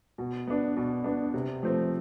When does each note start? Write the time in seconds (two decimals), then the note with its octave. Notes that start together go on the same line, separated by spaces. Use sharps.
0.18 B2
0.47 B3 D4
0.77 B2
1.04 B3 D4
1.34 C3
1.63 F3 A3 C4